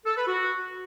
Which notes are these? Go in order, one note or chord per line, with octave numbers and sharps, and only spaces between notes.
A4
B4
F#4